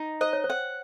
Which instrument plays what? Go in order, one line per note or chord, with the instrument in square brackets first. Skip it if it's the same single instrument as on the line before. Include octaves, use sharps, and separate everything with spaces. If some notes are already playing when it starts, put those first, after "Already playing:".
Already playing: [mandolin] D#4
[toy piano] C5 [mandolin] D#5
[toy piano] C#5
C5
[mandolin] F#5